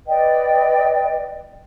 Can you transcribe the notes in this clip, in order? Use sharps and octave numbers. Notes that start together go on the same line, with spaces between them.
B4 D5 D#5 G5